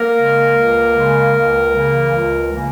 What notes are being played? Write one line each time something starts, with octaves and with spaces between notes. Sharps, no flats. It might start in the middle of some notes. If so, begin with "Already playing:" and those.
Already playing: A#3 A#4
C#3 G#3
C#2
C#3 G#3
C#2
C#3 E3 A#3
C#2
C#3 E3 A#3